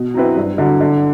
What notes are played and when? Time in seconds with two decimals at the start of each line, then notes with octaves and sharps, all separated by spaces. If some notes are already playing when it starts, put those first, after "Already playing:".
Already playing: B2
0.14 F#3 C4 E4 B4
0.37 G2
0.58 D3 F#3
0.81 D3